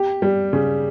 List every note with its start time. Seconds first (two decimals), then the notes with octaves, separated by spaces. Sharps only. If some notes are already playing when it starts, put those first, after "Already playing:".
Already playing: G4
0.22 G3
0.53 C#3